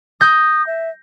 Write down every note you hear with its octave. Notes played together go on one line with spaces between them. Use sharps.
D#6 G6 A#6
E5